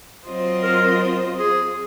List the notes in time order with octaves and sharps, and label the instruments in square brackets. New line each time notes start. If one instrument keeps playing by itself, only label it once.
[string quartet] F#3 C4 F4 C5 D#5
[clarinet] A#4
G#4